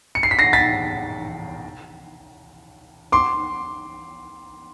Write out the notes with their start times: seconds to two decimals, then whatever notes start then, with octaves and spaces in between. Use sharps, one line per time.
0.15 C#7
0.23 C7
0.31 B6
0.39 A#6 C7
0.53 A6 B6
3.12 C6 D6